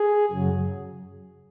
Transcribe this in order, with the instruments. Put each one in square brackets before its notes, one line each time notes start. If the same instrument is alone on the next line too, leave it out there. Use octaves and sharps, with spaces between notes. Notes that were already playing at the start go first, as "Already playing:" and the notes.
Already playing: [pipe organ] G#4
F#2 C#3 F#3